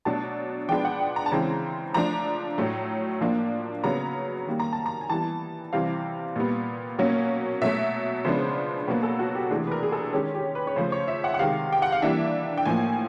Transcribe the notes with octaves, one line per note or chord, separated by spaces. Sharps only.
B2 F#3 A3 D4 A5
F3 G#3 B3 D4 G5
F#5
G5
A#5
A5
C#3 E3 G#3 C4 A#5
F3 A3 D4 A#5
A2 F#3 A3
F3 A#3 D4
C#3 F#3 B3 A#5
D#3 G3 A#3
A#5
A5
A#5
G#5
E3 G3 B3 A5
C3 E3 G3 C4 F5
A#2 G3 B3
B2 F#3 A#3 C#4
B2 F#3 A3 E5
C#3 F3 G#3 B3 D4 C5
B2 F#3 A#3 B4
A4
F#4
G4
C3 E3 A3 D4 G#4
B4
A#4
G#4
A4
D#3 G#3 C#4 G4
G4
B4
C#5
C#3 F3 A3 C5
C#5
E5
F#5
F#5
C3 D#3 G#3 F5
G5
F#5
F5
E3 G3 A#3 D4 E5
G5
A2 F3 A#3 G#5